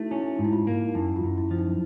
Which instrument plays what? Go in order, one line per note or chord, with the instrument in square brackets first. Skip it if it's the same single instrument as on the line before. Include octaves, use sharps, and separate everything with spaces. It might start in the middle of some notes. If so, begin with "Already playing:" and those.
Already playing: [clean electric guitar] A3 [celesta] D#4 E4 F#4
[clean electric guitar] C#4 [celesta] E4
[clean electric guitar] G#2 [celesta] D#4
[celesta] E4
F4
[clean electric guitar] A#3
[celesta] D#4
[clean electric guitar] F#2 [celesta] E4
[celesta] F4
[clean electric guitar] F#2
[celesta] E4
[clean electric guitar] F3
[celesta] D#4